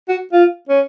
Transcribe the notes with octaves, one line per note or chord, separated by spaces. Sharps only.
F#4
F4
C#4